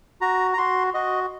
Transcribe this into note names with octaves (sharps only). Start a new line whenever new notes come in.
F#4 A#5
A#5
F#4 C6
F#4 D#5